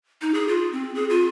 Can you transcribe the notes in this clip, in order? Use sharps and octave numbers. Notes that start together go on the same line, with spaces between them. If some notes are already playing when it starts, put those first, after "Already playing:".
D#4
G#4
F4
C4
G#4
F4